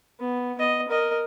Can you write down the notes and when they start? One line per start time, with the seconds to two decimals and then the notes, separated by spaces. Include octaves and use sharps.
0.20 B3
0.59 B3 D#5
0.88 A#4 D#5